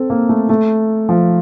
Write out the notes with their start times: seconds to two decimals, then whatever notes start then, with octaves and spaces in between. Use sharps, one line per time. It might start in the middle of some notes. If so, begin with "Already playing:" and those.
Already playing: C4 A4
0.10 A#3
0.29 A3
0.49 A3
1.09 F3